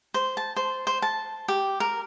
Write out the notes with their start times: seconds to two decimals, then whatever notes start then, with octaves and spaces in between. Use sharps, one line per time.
0.14 C5
0.37 A5
0.56 C5
0.87 C5
1.02 A5
1.48 G4
1.80 A#4